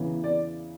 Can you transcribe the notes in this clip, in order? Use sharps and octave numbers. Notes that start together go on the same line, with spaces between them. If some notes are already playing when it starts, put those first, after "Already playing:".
Already playing: E2 C#3 E3
D5